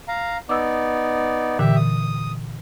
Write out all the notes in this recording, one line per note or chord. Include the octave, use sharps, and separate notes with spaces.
F5 A#5
B3 D#4 D5 D6 E6
A#2 D3 E3 G4 E5
D#6